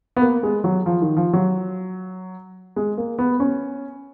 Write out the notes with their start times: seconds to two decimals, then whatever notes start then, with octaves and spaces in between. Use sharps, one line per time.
0.17 B3
0.21 A#3
0.43 G#3
0.64 F#3
0.86 F3
1.02 D#3
1.17 F3
1.33 F#3
2.76 G#3
2.97 A#3
3.19 B3
3.40 C#4